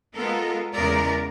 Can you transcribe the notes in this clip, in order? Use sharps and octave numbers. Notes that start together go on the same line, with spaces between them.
G#3 B3 F4 A4 A#4
E2 C#3 G#3 A#4 D5